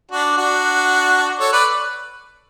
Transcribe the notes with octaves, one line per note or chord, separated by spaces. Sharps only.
D4 F#4
D4 F#4
A4 C#5
B4 D5